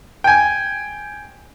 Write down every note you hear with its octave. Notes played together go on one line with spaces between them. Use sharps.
G5 G#5